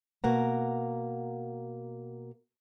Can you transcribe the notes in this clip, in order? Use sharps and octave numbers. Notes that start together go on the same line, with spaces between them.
B2 A#3 F#5 A#5